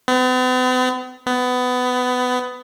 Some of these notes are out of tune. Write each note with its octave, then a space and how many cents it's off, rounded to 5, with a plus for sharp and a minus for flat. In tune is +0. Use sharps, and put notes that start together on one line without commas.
B3 +45
B3 +20